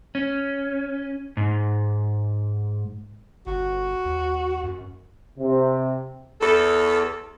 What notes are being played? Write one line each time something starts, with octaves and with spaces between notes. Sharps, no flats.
C#4
G#2
G1 F#4
D#2
F#2
C3
E2 A4